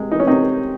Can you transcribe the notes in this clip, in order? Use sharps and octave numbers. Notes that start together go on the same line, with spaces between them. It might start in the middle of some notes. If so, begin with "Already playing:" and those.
Already playing: C3 G#3
E3 D#4
C#4
C3 C4 D#4